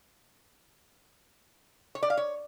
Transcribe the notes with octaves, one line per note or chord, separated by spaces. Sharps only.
C#5
D5
F5
C#5